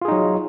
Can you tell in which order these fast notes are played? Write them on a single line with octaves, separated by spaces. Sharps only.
F4 G#4 D#4 F#3